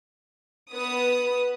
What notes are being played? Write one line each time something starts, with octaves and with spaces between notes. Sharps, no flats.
B3 B4 D#6